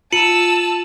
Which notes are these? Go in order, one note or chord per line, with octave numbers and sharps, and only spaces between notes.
F4 A5 E6 C#7 D#7 F#7